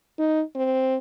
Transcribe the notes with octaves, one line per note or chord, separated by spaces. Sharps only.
D#4
C4